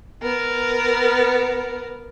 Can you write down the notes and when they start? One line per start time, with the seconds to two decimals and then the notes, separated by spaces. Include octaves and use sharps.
0.22 B3 A#4